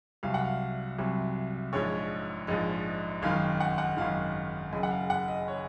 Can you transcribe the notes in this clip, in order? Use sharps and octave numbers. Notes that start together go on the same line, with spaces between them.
C2 C3 F#3 F5
F#5
F5
C2 C3 F#3
A#1 G#2 F3 C#5
A#1 G#2 F3 D#5
G#1 F#2 D#3 F5
F#5
F#5
G#1 F#2 D#3 F5
F#1 F#2 C#3 D#5
F#5
F5
F#5
D#5
C#3 C#5